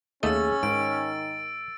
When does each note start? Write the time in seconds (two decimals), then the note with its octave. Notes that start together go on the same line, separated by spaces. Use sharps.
0.23 D#2 A3 C#4 G#4 D#5 E6 A6
0.63 G#2 D#3 D7